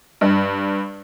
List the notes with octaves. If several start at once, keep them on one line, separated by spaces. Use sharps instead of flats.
G2